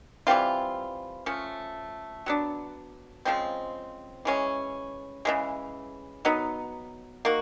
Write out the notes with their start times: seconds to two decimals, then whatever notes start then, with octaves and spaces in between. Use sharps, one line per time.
0.27 E3 G3 C4 F4
1.26 F3 A3 C#4
2.26 F#3 B3 D4
3.25 C#3 F3 G#3 C4
4.25 E3 G#3 C#4
5.25 C#3 E3 G#3
6.25 F#3 B3 D#4
7.25 A#3 D#4 F#4